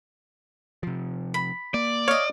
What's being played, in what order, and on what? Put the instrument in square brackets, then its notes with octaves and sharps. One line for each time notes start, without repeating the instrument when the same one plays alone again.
[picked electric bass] C3 F3
[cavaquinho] B5
[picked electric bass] A#3 [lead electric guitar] D5
[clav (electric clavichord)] C#5 [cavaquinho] D#5 F5